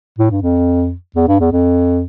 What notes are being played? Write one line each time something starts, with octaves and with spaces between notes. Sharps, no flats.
A2
G2
F2
E2
G2
E2
F2